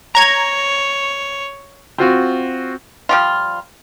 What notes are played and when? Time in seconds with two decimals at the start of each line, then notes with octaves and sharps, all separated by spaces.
0.15 C#5 A#5 G#6
1.98 C4 F4 F#4
3.09 F3 G3 F4